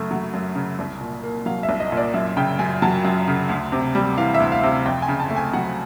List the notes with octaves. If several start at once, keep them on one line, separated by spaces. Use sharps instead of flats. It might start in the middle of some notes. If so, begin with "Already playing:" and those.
Already playing: F#2 C#3 A3 E5
F#3
F#2
C#3
C2
A#2
A#3
F#3 F5
E5
C2
D#5
A#2
D5
F#2 E5
C#3 G5
F#2 G#5
F#3 A5
F#2
C#3
D2
C3
G3
E3 F5
E5
D2
F5
C3
F2 G5
G#5
C#3
A5
A3
G#5
F#3 F#5